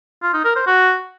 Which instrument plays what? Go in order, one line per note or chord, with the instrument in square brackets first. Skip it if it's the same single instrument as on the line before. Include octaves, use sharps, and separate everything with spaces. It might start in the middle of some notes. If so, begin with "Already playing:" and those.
[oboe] F4
D#4
A#4
C5
F#4